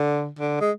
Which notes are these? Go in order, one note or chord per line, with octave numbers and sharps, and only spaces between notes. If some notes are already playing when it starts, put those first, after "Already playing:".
Already playing: D3
D3
G#3